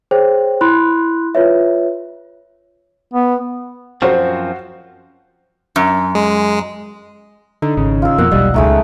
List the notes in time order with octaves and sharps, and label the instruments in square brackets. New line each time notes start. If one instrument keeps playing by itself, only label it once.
[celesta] G#4 C5 C#5 G5
E4 B5 C6 F#6
F4 B4 C#5 E5
[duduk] B3
[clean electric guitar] F#2 F3 C4 [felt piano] F#4 C5
[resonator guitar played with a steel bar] F#2
[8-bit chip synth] G#3
[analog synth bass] D3 [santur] D#4
[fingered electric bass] G#1 [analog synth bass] C#3
[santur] F4 E6
[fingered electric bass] F2 B2 [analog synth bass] A#3 [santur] F#5
[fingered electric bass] E1 B1 [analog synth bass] G3 [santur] D#5
[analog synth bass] C#2 [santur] G#3 A3 D#4